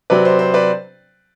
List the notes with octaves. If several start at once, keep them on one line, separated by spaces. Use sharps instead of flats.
C3 F#3 C4 B4 D5
C5
C5
B4 D5